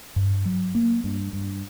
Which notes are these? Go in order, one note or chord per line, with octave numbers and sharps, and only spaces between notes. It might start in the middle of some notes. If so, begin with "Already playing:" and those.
G2
F#3
A#3
G2
G2